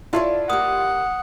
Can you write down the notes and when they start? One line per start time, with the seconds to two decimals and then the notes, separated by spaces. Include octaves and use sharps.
0.13 D4 E4 F4 A4 C#5 C6
0.50 A#3 G4 F#5 D#6